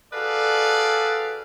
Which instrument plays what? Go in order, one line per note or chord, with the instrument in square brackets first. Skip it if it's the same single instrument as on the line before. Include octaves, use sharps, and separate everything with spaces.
[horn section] F#4 G#4 A4 B4 D5 F5